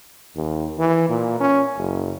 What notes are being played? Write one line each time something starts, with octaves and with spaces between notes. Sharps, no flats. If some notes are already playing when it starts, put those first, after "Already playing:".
D#2
E3
A#2
C#4
F#1